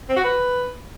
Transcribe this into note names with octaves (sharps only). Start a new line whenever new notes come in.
C4
F#4
B4